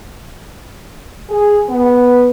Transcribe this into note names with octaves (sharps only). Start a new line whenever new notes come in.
G#4
B3